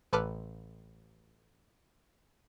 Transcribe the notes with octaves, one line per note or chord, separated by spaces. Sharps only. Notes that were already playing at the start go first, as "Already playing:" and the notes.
A1 A4 B4 D6 F6 F#6